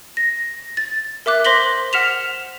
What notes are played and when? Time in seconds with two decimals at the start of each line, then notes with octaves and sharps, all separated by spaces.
0.17 A#6
0.77 A6
1.26 A#4 E5 D6 F#6
1.45 C5 C6 A#6 B6 F#7 G7
1.93 F#5 F6 B6 E7 F7